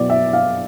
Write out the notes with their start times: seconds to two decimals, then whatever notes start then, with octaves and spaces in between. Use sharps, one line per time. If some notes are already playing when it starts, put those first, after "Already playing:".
Already playing: B2 F#3 B3 E4 D5
0.10 E5
0.33 F5